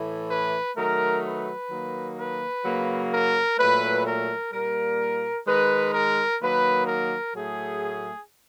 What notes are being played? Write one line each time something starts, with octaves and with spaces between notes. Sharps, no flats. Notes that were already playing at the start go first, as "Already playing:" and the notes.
Already playing: A2 E3 A3
B4
D#3 F#3 A3 A#4
B4
D#3 F#3 A#3
B4
C#3 F#3 A#3
A#4
A#2 F#3 A3 B4
A#4
A#2 G3 A#3 A#4
D#3 G#3 B4
A#4
D#3 F#3 A#3 B4
A#4
A2 F#3 A3 G#4